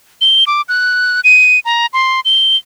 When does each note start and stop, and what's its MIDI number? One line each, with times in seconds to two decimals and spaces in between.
0.21 0.44 103
0.47 0.62 86
0.69 1.21 90
1.24 1.60 99
1.65 1.86 82
1.93 2.20 84
2.25 2.56 103